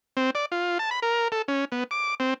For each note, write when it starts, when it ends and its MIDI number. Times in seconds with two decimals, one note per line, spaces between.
0.17 0.30 60
0.35 0.46 74
0.52 0.78 65
0.79 0.90 81
0.91 1.00 83
1.02 1.28 70
1.32 1.42 69
1.48 1.65 61
1.72 1.84 59
1.91 2.15 86
2.20 2.34 60